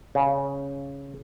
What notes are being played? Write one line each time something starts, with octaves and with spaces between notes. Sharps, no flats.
C#3